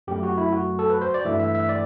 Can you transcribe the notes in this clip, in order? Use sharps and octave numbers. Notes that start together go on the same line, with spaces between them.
F#2 F#3 A3 G4
F#4
E4
F#4
A4
B4
C5
D5
G2 E3 A3 E5
E5
E5
D5